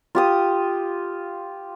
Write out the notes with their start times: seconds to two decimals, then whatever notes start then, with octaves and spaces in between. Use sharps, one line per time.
0.15 F4 G4 D#6